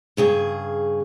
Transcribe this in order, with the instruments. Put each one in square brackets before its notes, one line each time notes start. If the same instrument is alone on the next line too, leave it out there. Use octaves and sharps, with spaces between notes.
[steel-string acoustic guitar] G2 C#3 G#4